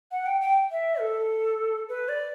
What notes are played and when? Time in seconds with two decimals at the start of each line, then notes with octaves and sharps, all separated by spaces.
0.11 F#5
0.26 G5
0.41 G5
0.71 E5
1.00 A4
1.89 B4
2.08 D5